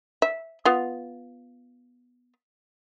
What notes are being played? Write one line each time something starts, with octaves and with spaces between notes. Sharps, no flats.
E5
B3 F4